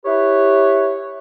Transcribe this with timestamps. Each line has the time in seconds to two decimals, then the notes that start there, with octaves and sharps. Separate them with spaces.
0.05 E4 G4 B4 C#5